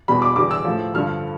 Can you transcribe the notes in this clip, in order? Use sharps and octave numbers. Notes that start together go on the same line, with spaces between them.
E2 B2 G3 B5
D6
E2 D3 G3 D6
E6
A2 F3
G2 D3 F3 F6